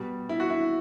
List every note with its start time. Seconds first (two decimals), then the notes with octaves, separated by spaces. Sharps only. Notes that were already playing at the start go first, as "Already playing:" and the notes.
Already playing: B2 G3
0.29 E4
0.40 F#4
0.50 E4